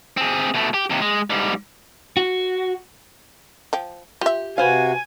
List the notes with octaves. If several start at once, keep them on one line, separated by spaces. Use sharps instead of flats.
C4 G#4
B2 A3
G4
D#2 C3
G#3
G#2 G3
F#4
F3 G5
F4 G4 E5
C3 F#4 B4 C5 F5 G#5